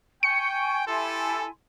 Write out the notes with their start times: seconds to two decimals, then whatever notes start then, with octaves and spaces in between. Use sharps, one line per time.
0.23 G5 G#5 C#6 C#7
0.86 E4 G4 A4 G#5 C6